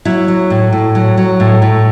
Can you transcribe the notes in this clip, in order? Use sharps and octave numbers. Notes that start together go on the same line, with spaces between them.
F#3 E4
F#3
A2
A2
F#3
F#3
A2
A2